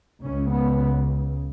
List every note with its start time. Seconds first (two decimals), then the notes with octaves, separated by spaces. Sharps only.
0.22 C#2 C#3 C#4
0.51 B3